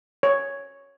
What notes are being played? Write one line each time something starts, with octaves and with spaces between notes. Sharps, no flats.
C#5